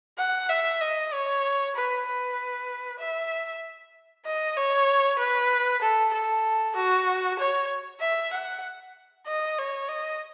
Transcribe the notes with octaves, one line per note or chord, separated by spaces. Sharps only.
F#5
E5
D#5
C#5
B4
B4
E5
D#5
C#5
B4
A4
A4
F#4
C#5
E5
F#5
D#5
C#5
D#5